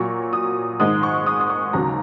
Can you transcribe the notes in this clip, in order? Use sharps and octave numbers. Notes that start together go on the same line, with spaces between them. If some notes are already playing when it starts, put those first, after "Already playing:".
Already playing: A#2 F#3 C#6
D#6
G#2 D#3 G#3 D#6
C#6
D#6
D#6
C#6
D#2 C#3 F#3 A#5